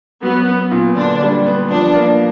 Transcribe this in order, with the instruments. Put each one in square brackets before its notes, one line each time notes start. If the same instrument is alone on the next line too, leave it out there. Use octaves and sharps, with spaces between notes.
[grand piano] F#3 [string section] B3
[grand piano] B3
A#2
[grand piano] D3 [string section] D4
[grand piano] G3
B3
[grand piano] F3 [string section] D4
[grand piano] A#3